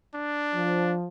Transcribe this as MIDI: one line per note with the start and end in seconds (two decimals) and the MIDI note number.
0.15 0.95 62
0.54 1.05 53